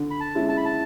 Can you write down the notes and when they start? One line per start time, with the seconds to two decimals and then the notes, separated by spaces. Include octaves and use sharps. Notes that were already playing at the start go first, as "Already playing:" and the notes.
Already playing: D3
0.11 B5
0.20 A5
0.35 G#3 C#4 E4
0.49 A5
0.57 B5
0.66 A5